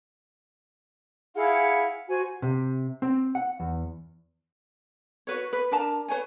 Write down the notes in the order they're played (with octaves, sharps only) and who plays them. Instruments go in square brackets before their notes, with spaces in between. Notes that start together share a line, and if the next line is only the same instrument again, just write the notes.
[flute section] E4 G#4 F5 F#5
F#4 C5 G#5
[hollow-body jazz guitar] C3
C4
F#5
E2
[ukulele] F#4 B4 C#5
B4
D4 A#4 A5 A#5
B4 C#5 G#5